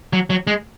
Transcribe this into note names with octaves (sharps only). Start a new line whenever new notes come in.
F#3
F#3
G#3